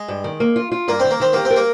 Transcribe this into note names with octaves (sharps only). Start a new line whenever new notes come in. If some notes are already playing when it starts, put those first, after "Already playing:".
Already playing: G#3
G2
D#3
A#3
F4
F4
G2 A#3
D#3 C4
A#3
D#3 C4
A#3 G4
C4
A#4
A#3